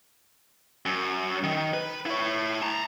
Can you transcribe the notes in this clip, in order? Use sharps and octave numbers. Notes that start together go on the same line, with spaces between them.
F#2
D#3
B4
E4 C#5
A5 A#5